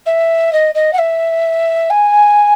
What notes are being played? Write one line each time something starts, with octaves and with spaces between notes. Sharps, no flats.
E5
D#5
D#5
F#5
E5
G#5